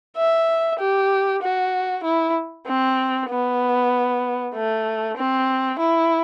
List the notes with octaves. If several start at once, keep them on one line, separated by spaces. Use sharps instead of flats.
E5
G4
F#4
E4
C4
B3
A3
C4
E4